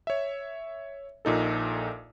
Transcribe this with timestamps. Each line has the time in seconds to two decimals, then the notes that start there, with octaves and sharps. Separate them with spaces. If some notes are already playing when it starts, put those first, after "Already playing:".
0.07 C#5 E5
1.25 A#1 A#2 D#4 A4